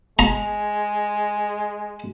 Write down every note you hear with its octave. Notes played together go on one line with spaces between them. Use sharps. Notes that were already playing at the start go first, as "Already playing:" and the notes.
G#3 A#5